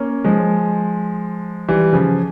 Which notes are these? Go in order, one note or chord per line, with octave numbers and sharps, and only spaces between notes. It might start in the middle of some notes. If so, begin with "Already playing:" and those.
Already playing: A#3 C#4
F3 G#3
E3 G3
C#3 F3